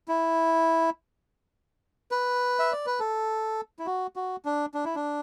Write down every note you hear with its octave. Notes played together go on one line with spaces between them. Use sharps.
E4
B4
E5
D5
B4
A4
E4
F#4
F#4
D4
D4
E4
D4